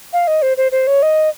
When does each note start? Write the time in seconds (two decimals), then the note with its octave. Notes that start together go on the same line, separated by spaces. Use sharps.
0.13 F5
0.27 D#5
0.42 C5
0.57 C5
0.72 C5
0.87 C#5
1.02 D#5